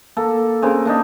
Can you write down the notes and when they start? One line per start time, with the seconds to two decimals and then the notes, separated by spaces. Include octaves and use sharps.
0.17 A#3 A4
0.62 C#3 C4 A#4
0.85 A#3 D4 D#4